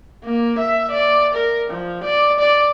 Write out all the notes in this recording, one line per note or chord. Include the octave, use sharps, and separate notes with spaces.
A#3
E5
D5
A#4
F3
D5
D5